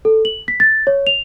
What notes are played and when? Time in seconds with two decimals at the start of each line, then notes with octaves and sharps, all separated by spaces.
0.05 A4
0.25 F#7
0.48 B6
0.60 A6
0.87 C#5
1.07 F7